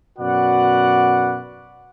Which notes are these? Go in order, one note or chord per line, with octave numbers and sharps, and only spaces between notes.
F#2 B2 F#4 B4 D5 F#5